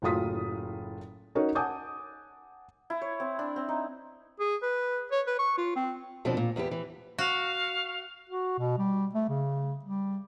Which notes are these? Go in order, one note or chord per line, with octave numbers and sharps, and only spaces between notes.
F#1 A2 F#3 F4 D#6 B6
C#4 D#4 F#4 A#4 C#5
F#5 G#5 A5 D6 D#6 G6
E4
C#5
C4
D4
C4
D#4
G#4
B4
C#5
B4
C#6
F4
C4
D#2 B2 F3 C4 D4
A#2
E2 B3 F4 G4
E3
F#4 F5
F#4
B2
G3
A3
C#3
G3